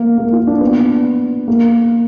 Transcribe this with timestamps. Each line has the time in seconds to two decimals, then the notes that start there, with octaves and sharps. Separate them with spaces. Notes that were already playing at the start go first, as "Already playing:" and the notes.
Already playing: A#3
0.18 A#3
0.33 F4
0.47 D4
0.61 B3
1.48 A#3